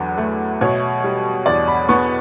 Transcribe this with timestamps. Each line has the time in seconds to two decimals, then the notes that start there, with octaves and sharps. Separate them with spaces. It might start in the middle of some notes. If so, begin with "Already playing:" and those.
Already playing: E2 D3 F#3 B4
0.18 A3
0.61 B2 C#5
1.04 G3
1.46 E2 D5
1.68 B5
1.89 B3 C#6